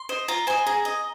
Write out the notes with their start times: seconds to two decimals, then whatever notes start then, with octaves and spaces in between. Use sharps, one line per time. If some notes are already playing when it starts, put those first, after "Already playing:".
Already playing: C6
0.09 C5 D#5
0.28 F4 A#5
0.47 C5 D#5 G#5
0.66 G#4 A#5
0.85 D#5